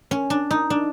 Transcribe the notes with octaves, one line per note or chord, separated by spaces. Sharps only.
C#4
D4
D#4
D4